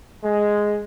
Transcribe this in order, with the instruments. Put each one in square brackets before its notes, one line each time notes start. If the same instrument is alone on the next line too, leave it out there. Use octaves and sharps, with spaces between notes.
[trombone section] G#3